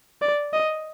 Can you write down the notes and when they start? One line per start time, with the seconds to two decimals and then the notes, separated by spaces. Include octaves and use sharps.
0.22 D5
0.53 D#5